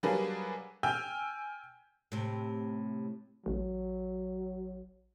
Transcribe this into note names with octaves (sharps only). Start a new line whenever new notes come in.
F#3 G3 A#3 D4 G#4 B4
G5 G#5 E6 F6 G6
A2 C3
A1 F#3